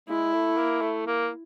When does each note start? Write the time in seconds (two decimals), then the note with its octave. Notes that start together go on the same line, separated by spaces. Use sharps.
0.09 G#3 E4
0.33 A3
0.57 A#3
0.81 A3
1.07 A#3